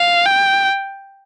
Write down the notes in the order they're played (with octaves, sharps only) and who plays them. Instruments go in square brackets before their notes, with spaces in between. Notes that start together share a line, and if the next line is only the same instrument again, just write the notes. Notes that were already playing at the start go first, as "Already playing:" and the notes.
Already playing: [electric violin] F5
G5